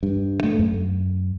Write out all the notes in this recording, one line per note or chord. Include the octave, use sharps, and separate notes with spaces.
G2
A3
F#2